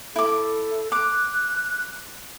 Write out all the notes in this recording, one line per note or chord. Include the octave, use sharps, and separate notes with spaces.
E4 A4 D6
D6 F#6